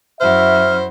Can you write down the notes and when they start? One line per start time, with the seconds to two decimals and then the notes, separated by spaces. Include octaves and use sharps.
0.20 F#2 E4 F#4 C5 E5 F6